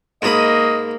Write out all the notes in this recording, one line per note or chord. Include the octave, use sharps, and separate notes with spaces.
G#2 A#3 G#4 D#5 B5